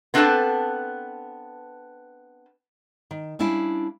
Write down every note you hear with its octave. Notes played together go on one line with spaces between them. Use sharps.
B3 C4 D4 A4 B4 A5
D#3
G3 C#4 D4 E4 F5